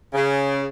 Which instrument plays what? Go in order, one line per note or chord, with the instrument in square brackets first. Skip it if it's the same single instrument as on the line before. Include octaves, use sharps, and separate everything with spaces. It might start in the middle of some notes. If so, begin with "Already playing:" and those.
[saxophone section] C#3